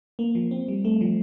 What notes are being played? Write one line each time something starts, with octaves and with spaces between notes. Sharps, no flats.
A#3
F3
C4
G3
A3
F3